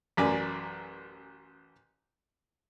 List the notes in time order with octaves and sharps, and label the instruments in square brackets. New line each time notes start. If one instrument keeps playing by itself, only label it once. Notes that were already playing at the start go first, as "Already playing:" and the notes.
[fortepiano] A1 F#2 D5 G#5